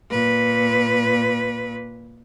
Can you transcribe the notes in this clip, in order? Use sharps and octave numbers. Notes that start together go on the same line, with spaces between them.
A#2 B4